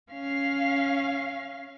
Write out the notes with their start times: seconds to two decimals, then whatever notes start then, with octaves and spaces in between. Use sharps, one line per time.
0.12 C#4 F5